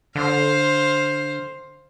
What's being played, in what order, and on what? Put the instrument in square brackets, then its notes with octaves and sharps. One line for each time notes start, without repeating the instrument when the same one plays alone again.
[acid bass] D3 [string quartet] C5 F5